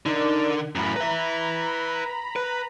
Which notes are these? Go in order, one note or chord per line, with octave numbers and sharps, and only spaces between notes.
D3 D#4 A#4 D5
F#2 A2 A#5 B5
B4 E5
B4